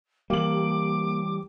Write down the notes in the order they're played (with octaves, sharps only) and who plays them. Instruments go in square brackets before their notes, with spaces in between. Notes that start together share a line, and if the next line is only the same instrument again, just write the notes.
[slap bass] E3 G3 [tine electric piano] A#3 [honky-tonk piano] G4 F#7 [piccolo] D6